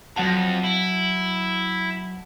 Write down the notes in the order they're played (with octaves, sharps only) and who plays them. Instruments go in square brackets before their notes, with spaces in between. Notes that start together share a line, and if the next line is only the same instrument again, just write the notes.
[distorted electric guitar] F2 [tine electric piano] F#3 F#5 A5
[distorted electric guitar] E4